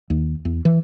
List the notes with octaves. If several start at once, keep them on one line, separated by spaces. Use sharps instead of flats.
D#2
E2
E3